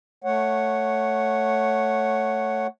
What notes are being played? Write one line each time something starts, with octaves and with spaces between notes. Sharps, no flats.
A3 C#5 F#5